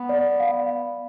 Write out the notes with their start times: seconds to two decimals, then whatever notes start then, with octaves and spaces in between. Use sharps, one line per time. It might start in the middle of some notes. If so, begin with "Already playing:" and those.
Already playing: B3
0.09 D5
0.40 F5